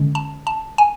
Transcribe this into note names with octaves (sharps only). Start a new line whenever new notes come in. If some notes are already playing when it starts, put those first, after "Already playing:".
Already playing: D3 G#3 C#4
A5
A5
G#5